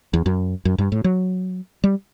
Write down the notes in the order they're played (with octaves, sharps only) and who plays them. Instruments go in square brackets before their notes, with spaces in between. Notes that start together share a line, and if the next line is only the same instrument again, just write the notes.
[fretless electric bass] E2
F#2
F#2
G2
A2
F#3
G3